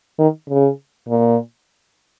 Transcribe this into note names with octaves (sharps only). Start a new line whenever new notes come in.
D#3
C#3
A#2